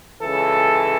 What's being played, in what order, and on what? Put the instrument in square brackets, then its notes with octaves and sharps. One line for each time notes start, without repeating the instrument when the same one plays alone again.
[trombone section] C#2 C#3 E3 A4